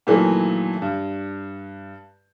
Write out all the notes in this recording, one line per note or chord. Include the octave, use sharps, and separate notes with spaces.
A#2 D#3 E3 F#3 A3
G2